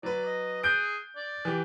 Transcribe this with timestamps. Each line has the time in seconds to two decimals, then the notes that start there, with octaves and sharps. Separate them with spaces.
0.03 F#3 B4 D5
0.26 D#5
0.64 G#4 F#6 G6 D7
1.16 D5
1.45 E3 G4